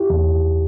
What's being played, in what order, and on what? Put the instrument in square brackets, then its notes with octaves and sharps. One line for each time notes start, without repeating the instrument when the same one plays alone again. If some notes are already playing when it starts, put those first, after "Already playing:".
Already playing: [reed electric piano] E4 G4
E2